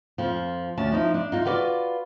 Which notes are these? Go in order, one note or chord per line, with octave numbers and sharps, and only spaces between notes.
F2 F3
D2 C#4 A5
F3 D#4 E4
D4
D#4 F4
F4 F#4 B4 D5